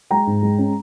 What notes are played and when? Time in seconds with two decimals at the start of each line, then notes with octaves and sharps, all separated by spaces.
0.11 G#3 G5 A#5
0.27 G#2
0.42 G#3
0.59 C#4